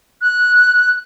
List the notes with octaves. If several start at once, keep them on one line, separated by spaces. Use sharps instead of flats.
F#6